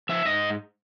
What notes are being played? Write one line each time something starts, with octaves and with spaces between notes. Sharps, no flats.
F3 E5
G#2 D#5